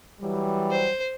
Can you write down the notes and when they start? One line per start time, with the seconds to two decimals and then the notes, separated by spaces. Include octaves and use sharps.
0.21 E3 F#3 G3
0.70 C5